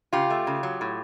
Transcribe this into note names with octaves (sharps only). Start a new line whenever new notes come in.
C#3 F4 G4
A3
C#3
F#3
A2